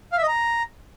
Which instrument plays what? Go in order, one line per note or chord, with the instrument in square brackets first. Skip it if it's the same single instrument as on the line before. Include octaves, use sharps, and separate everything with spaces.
[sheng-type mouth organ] F5
E5
D#5
A#5